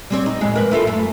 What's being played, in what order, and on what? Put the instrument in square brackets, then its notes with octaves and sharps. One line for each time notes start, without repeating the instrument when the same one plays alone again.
[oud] G3 C4 C#5
D#4
F2 A2 G#3
A#4 B4
E4 F4 A4
F#2 A3